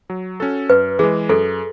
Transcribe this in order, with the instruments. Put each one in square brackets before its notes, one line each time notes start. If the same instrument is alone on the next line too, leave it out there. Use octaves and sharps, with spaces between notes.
[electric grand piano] F#3
C#4 F#4 A4
[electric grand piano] F#2 [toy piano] B4
[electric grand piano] E3 [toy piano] G#4
[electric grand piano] G#3
[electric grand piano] F#2 [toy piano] A4